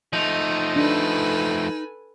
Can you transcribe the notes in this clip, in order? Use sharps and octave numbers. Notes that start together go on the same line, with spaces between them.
F3 A3 D#4
D4 A4 B4 G#5